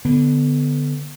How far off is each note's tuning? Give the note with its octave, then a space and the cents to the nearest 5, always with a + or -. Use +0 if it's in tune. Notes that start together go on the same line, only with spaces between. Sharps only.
D3 +0 B3 +0